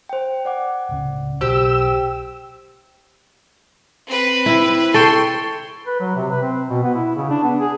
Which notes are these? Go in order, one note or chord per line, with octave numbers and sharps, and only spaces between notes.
C5 G5
D5 F#5 D6
D1 C#2 C#3
B1 G4 C5 E6
C4 B4
E4
A4 C#5 G5 C6
B4
F#3
C3
B4
C4
B2
B3
E4
C#3
D4
B3
G#4